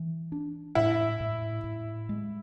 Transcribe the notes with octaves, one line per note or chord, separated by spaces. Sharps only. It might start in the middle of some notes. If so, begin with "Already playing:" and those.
Already playing: E3
D4
A2 E4
A2
A2
G#3